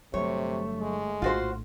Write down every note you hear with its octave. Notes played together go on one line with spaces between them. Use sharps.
G1 C3 F#3 A3 C#5
G#3
A#1 A2 F4 F#4 C5